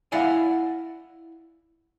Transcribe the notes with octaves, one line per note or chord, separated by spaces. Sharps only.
E4 D5 F5 F#5 G#5